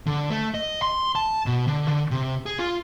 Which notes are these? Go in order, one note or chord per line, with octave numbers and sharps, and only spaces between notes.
D3
A3
D#5
C6
A5
B2
D3
D3
C3
G#4
F4